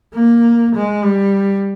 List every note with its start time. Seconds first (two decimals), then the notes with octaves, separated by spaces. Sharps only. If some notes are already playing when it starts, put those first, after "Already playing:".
0.15 A#3
0.75 G#3
1.04 G3